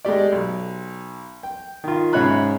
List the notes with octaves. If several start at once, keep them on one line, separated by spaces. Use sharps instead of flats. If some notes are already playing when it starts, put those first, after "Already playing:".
G#3 A3 G4 D5
B1
G5
D#3 F4
G#2 C#3 C#5 E5 B5 F#6